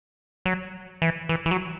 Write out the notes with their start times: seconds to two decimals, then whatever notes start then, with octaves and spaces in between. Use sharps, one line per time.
0.46 F#3
1.02 E3
1.29 E3
1.46 E3
1.51 F#3